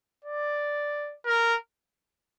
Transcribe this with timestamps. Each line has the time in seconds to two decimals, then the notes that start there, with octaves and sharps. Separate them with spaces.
0.25 D5
1.25 A#4